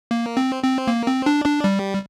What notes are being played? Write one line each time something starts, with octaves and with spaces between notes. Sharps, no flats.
A#3
C4
C4
A#3
C4
D4
D4
G3